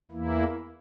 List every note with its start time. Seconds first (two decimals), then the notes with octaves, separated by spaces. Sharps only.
0.11 E2 E3 A#3 E4